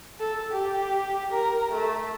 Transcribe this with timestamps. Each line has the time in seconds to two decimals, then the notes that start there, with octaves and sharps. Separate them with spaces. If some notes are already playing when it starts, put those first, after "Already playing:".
0.20 A4
0.52 G4
1.32 A#4
1.73 A3